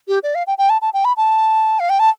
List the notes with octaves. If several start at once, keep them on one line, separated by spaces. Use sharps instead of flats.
G4
D5
F5
G5
G5
A5
A5
G5
B5
A5
F5
G5
A5